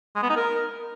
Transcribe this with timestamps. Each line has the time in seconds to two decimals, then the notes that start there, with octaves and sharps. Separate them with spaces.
0.16 G#3
0.23 B3
0.30 D#4
0.37 A#4